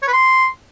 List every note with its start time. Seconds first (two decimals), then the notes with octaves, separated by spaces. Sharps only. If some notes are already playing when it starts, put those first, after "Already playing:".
0.02 C#5
0.08 B4
0.13 C6